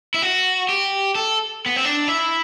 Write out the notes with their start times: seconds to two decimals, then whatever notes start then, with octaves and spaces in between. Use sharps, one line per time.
0.14 E4
0.22 F#4
0.69 G4
1.15 A4
1.66 B3
1.76 C4
1.85 D4
2.08 E4